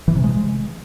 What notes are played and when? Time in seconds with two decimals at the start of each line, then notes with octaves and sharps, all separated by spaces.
0.08 E3
0.16 C3
0.24 G#3